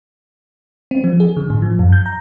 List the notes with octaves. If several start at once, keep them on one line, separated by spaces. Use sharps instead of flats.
C4
F3
G#4
D3
A2
F3
F#2
G6
A#5